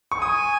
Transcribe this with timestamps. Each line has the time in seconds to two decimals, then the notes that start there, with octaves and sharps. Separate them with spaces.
0.12 C#6
0.22 G#5 D#6